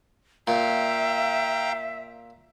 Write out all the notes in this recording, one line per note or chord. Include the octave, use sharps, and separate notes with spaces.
A#2 E5 F5 G5 A#5